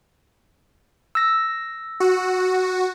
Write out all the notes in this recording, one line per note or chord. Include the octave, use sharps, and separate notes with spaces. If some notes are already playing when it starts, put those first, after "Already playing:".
E6 A#6
F#4